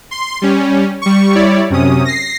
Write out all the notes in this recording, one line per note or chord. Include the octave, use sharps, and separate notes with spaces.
C6
G3 C#4
G3 C#6
G3 E4 C#5 D5
F#2 C3 C#4 D#6
A#6 C7